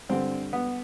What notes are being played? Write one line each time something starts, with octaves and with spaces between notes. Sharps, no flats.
G2 D3 C4
B3